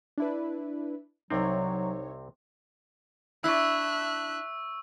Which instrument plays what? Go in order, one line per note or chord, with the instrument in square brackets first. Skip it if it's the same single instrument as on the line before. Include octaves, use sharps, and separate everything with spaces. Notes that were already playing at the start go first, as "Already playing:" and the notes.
[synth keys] D4 E4 B4
[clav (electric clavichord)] C2 C3 C4 [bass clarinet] F#3 [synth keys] D#4 C#5
[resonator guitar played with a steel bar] D4 E4 [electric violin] E5 F#6 [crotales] C#6 E6